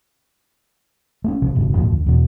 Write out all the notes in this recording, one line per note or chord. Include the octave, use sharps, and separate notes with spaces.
A3 C4 C#4
C2 C3 F3 A3
F#1 C#2 G2 B2
G#1 F2 A#2 F3
D2
E2 B2